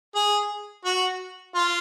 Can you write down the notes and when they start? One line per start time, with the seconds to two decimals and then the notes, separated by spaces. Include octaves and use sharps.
0.15 G#4
0.85 F#4
1.55 F4